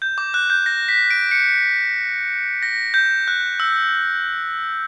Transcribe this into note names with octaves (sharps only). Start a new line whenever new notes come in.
G6
D6
F#6
G6
A#6
B6
D7
C#7
A#6
G6
F#6
E6